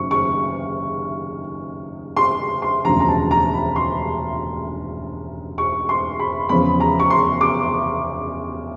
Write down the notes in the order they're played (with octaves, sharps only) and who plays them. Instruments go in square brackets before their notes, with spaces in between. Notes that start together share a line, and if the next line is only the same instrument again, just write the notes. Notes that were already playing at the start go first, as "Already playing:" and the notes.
Already playing: [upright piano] F#1 D#3 C#6
C#6
C6
C6
E1 D2 C#3 F3 A#5
A#5
A5
A#5
B5
C6
C#6
C6
B5
E2 C#3 F3 B5
A#5
C#6
C6
D6